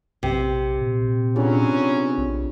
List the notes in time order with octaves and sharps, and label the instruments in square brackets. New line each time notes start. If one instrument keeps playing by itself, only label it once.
[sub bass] A#1 [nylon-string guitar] C3
[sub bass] A#2
[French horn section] F#3 B3 C#4 [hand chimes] D4 F4 G#4
[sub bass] A#1